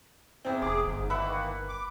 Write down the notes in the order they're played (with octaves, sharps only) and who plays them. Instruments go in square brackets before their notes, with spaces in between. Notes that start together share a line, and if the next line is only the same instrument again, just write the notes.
[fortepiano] E2 C4
[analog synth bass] F1 [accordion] G#4 [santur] D6
[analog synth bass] G1 [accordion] G#2
[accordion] D#3 E3 A#3 [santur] B4 F#5 [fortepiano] E5
[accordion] D6